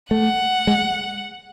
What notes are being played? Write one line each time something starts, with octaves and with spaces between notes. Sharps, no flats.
A3 F#5
G#3